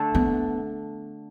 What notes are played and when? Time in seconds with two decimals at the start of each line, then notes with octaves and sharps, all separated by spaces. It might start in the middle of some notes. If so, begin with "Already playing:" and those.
Already playing: D3 A3 D4 A4
0.15 B3